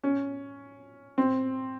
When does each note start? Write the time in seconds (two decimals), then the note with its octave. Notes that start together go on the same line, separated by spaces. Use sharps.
0.04 C#4
1.18 C4